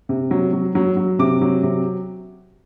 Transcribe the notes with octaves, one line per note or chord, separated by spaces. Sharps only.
C3
F#3
F#3
F#3
F#3
C3 D6
F#3
C3